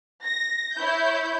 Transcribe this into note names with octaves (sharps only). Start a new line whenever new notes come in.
A#6
E4 C#5 E5 G6